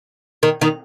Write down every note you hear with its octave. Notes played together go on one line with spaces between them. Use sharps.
D#3
D#3